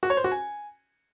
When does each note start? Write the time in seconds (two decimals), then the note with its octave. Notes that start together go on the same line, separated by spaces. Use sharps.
0.03 F#4
0.10 C#5
0.17 C5
0.24 F#4
0.32 G#5